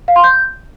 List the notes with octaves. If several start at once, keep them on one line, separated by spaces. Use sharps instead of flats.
F5
C6
G6